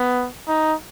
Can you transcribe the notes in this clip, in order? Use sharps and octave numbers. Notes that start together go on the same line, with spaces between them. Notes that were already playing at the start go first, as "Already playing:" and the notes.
Already playing: B3
D#4